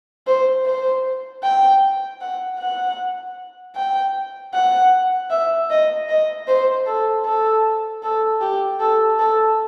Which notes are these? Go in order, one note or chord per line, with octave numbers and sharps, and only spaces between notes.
C5
C5
G5
F#5
F#5
G5
F#5
E5
D#5
D#5
C5
A4
A4
A4
G4
A4
A4